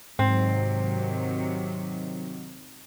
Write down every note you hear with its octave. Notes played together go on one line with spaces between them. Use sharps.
G#2 C3 D#3 F#3 C4